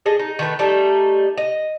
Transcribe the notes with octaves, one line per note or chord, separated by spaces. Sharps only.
G#4 A4 D#5
D#4
D#3 A3 B4
G3 A3 D#4 A4
D#5